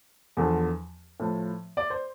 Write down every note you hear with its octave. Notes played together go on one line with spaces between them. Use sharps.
E2 D3 F3
A2 F3
D5
C5